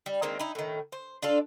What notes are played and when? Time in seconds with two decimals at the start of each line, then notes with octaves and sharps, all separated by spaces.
0.06 G3
0.22 D#3 G#3 A#3 C4
0.39 D#4 E4
0.55 A2 D#3
0.92 C5
1.22 D4 F4 A4